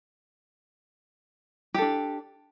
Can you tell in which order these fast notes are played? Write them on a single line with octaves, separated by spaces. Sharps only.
G4 A4 D4